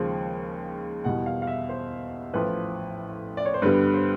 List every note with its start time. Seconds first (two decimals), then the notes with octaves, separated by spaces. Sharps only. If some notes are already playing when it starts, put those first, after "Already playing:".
Already playing: D#2 C#3 F3 G#3
1.04 E2 B2 G3 F#5
1.26 F5
1.42 F5
1.47 E5
1.69 C5
2.34 A1 A2 F3 B4
3.37 D5
3.46 C#5
3.54 C5
3.62 G2 D3 G3 B3 B4
3.94 C5